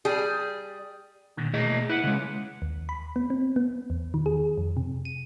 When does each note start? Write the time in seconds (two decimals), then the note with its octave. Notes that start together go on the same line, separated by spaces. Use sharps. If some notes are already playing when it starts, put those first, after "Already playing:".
0.05 G3 G#4
1.37 A#2 D3 D#3
1.54 B2 A3 A#3 G#4 D#5
1.89 E4 B4 F#5
2.04 C#3 G#3
2.62 D#2
2.89 B5
3.16 B3
3.30 C4
3.56 B3
3.90 E2
4.14 D#3
4.26 G#4
4.58 F2
4.77 C3
5.05 D#7